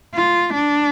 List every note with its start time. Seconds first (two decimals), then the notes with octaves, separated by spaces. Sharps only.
0.15 F4
0.54 D4